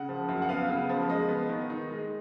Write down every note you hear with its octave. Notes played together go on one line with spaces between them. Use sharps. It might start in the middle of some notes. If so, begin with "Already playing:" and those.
Already playing: C#3 F#5
F3
F#2
F#5
B3 F5
C#3
F3
G#3 D#5
B3
D#3
D#4
G#3